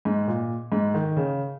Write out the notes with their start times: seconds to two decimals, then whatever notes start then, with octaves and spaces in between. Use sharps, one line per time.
0.05 G#2
0.28 A#2
0.72 G#2
0.94 D#3
1.17 C#3